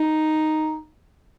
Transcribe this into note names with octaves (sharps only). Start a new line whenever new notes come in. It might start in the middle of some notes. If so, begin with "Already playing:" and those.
Already playing: D#4